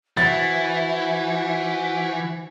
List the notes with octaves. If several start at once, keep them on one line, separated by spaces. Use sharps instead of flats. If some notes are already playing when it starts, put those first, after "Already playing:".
E3 F#4 C5 E5 F#5 A6